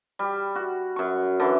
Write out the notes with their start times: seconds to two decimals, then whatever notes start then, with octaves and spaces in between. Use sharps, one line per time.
0.19 G3
0.55 F#4
0.96 F#2 C#6
1.40 D3 E3